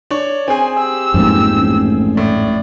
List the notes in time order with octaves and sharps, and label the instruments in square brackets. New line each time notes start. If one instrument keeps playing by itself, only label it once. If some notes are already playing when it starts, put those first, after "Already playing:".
[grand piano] D4 C#5
[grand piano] C4 G#4 [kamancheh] G#5
[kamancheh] G4 E6
[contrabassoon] A1 [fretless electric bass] F2 G#2 A#3
[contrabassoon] A1
[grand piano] A2 [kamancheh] D5